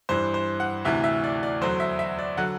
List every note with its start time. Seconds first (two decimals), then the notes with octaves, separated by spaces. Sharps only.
0.09 G2 E3 C5
0.34 C5
0.60 F#5
0.85 D2 C3 E3 E5
1.04 E5
1.24 D5
1.43 D5
1.61 E2 D3 F#3 C5
1.80 E5
1.99 E5
2.19 D5
2.37 D3 F#3 F#5